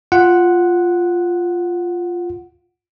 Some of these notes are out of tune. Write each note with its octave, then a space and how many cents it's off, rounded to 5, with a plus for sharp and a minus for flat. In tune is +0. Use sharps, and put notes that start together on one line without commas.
F4 +0 F#5 +0